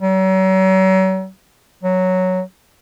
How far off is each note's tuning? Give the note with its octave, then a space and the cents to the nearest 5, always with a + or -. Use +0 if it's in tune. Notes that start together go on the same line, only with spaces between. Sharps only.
F#3 +40
F#3 +0